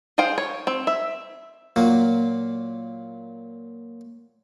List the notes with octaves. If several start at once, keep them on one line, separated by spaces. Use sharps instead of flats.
G#4 C5 F5 G5
C#5
C4
E5
A#2 F#3 A#3